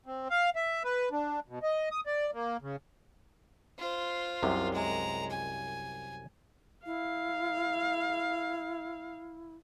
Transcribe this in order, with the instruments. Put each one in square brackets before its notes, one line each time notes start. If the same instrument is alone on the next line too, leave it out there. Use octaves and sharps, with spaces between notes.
[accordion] C4
F5
E5
B4
D4
B2
D#5
D#6
D5
A#3
C#3
[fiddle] F4 C5
[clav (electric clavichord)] C2 F#2 C3
[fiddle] G#3 A#5
G#5
[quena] E4 [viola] F5